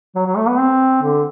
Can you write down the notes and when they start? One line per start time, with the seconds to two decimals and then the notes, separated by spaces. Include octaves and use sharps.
0.15 F#3
0.26 F#3
0.37 A3
0.48 B3
0.59 C4
1.02 D3